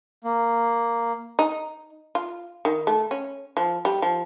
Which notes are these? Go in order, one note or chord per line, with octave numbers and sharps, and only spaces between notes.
A#3
D#4
F4
D#3
A3
C#4
F3
G3
F3